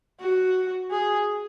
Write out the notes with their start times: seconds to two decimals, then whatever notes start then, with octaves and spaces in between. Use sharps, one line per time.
0.20 F#4
0.91 G#4